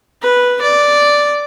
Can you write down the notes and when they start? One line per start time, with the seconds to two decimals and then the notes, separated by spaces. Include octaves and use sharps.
0.22 B4
0.61 D5